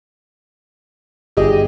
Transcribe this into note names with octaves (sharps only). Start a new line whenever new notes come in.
G1 G4 G#4 D#5